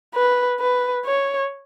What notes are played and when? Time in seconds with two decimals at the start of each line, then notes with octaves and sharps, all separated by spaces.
0.14 B4
0.60 B4
1.05 C#5